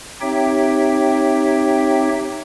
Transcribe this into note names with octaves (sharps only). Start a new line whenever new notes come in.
C4 D#4 G4 C#5 E5 G5